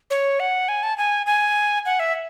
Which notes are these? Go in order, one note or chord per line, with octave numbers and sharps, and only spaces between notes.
C#5
F#5
G#5
A5
G#5
G#5
F#5
E5